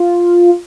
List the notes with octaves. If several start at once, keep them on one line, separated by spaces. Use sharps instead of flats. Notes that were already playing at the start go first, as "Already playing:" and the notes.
Already playing: F4